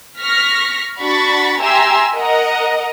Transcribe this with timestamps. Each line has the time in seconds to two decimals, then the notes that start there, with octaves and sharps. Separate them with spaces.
0.18 C#6 F6 A#6 B6
1.01 D4 F#4 B5 C#6 A6 B6
1.61 G4 E5 G#5 A#5 C6 E6
2.14 A#4 D#5 F#5 A#5